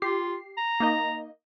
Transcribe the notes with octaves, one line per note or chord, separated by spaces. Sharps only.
F4 G4 C7
A#5
A#3 D#4 D#5